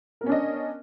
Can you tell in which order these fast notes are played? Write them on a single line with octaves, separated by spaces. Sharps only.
A#4 B3 C#4 D4 D#5